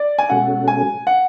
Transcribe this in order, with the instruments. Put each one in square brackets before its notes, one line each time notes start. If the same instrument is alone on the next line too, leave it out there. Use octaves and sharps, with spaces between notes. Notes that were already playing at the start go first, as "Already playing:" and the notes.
Already playing: [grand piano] D5
G#5
[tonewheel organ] B2 G#3 C#4 F#4 A4 [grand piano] F#5
[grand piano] G#5
F#5